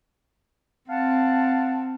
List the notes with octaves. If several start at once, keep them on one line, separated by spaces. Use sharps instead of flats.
C4 F5 F#5 A5